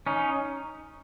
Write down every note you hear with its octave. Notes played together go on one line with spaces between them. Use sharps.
C#4 D#4